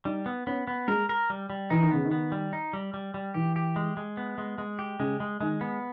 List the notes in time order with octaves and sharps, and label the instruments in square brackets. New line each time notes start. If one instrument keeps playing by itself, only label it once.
[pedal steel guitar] G3 [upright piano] D#4
[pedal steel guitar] B3
[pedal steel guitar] B3 [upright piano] C#4
[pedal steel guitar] B3
[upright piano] G#3 [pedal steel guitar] A#4
[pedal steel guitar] A#4
G3
G3
[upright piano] E3 [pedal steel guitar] D#4
[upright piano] D#3
[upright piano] C#3 [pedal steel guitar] B3
[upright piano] D#3
[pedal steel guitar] B3
G3
D#4
G3
G3
G3
[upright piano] E3 [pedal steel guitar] G4
[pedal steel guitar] G4
G#3
G#3
B3
G#3
G#3
G4
[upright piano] C#3 [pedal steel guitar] G#3
[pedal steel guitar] G#3
[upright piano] D#3 [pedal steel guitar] G#3
[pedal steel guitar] B3